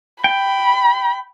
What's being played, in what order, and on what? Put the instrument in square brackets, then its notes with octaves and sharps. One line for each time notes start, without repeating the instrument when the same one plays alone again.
[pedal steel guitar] G5 [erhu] B5